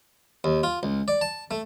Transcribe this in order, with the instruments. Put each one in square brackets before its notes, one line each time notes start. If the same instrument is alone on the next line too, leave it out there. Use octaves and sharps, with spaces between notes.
[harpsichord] D#2
F4
C#2
D5
A5
A3